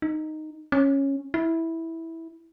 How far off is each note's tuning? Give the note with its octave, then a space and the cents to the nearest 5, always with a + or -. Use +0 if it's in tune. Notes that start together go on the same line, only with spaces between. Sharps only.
D#4 -5
C#4 -10
E4 -10